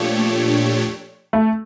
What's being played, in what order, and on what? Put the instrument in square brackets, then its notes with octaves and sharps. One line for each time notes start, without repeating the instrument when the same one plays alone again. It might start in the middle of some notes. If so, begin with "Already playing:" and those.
Already playing: [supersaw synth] A#2 A3 D4 G4 C#5 [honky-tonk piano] F3
[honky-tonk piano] A3